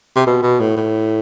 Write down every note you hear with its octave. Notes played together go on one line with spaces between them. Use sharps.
C3
B2
B2
A2
A2